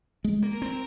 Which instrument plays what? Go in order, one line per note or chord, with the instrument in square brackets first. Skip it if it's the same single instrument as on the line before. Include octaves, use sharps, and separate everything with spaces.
[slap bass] G#3
A#3
[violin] A#4
[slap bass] C4